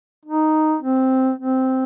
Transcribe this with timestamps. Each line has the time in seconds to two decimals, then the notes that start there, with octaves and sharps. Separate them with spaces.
0.25 D#4
0.82 C4
1.38 C4